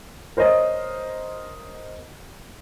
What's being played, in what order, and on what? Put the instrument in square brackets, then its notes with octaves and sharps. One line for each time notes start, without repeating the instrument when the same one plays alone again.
[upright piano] A#4 C5 C#5 D#5